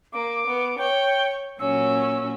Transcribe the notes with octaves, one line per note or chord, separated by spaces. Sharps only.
A#3 D6
B3
C#5 G5
A#2 F#3 C#4 E6